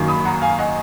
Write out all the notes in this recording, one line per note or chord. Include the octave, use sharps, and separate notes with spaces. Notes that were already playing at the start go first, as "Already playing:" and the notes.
Already playing: F#2 D#3 A#3
B5 D#6
F#5 A#5
F5 G#5
D#5 F#5